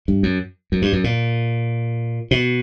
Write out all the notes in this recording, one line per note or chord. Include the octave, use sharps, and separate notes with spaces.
G2
F#2
F#2
G2
F#2
A#2
B2